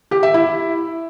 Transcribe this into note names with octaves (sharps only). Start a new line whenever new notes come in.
G4
E5
E4